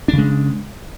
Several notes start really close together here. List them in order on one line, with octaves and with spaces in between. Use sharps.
D4 C#3 G#3